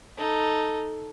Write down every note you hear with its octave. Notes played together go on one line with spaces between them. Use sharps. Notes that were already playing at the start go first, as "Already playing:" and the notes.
D#4 A4